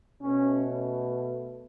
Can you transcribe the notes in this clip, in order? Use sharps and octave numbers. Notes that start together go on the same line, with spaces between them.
B2 A3 C#4